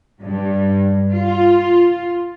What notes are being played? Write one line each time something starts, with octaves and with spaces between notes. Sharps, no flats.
G2
F4